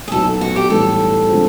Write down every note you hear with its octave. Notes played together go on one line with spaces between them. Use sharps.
G#4
B1 B2 F#3 A4
F#4
G4
A2 E3 G3 A4
D3 F3 G#3 C4